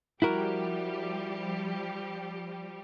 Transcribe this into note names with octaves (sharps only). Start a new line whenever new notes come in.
F3 G3 E4 F#4 G4 A#4